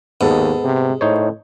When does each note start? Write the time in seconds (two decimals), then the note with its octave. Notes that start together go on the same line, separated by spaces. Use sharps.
0.21 D#2 G#2 B3 A4
0.64 C3
1.01 A2 D#4 C5 C#5